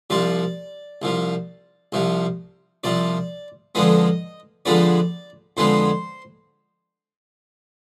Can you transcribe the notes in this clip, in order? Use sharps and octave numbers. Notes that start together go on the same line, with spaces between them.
C2 C3 F3 D5
C2 C3 F3
C2 C3 F3
C2 C3 F3 D5
F2 D3 F3 G#3 B3 D#5
F2 D3 F3 G#3 B3 D5
F2 D3 F3 G#3 B3 C5